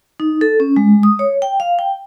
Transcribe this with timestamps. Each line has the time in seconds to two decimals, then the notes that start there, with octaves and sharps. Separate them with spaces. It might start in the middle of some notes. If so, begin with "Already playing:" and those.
0.20 D#4
0.41 A4
0.60 C#4
0.76 G#3
1.03 D#6
1.19 C#5
1.42 G5
1.60 F5
1.79 G5